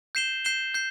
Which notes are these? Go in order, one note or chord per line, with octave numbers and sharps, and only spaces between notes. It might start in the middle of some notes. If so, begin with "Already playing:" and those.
G6 C7 E7 G7
G6 C7 E7 G7
G6 C7